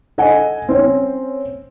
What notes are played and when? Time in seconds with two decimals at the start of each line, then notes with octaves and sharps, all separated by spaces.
0.18 A4 D#5 F#5 G#5
0.69 C4 C#4 C5